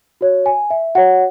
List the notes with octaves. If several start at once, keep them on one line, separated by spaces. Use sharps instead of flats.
F#4 C#5
G#5
E5
F#4 C#5 F#5